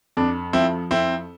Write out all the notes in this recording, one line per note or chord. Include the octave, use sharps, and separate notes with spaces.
F2 D4
F3 C4 E4
F2 C4 E4